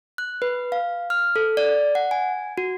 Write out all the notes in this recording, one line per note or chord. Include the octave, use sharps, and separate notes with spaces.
F#6
B4
F5
F6
A4
D5
F#5
G#5
F#4